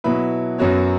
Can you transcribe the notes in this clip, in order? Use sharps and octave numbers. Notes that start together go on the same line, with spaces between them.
B2 F#3 E4 B4
F#2 F#3 B3 F#4 C#5